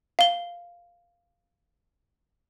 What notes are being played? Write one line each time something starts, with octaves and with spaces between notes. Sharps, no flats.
F5 G7